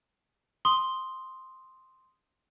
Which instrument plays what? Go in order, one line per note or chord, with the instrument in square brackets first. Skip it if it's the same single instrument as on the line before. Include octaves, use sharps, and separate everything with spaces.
[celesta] C6 D#6 G7